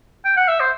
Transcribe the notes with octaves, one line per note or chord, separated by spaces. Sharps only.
G5
F#5
E5
C5